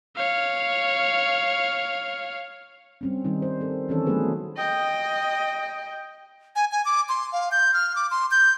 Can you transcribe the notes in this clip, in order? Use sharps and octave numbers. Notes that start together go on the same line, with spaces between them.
C#5 F5
G3 C4 C#4
D#3 G3 D#4
C5
C4 A4
D#3 E3 C4 C#4 A4 C#5
F#3 A3 B3 C#4 G#4 B4
D#5 G5
G#5
G#5
D6
C6
F5
G6
F6
D6
C6
G6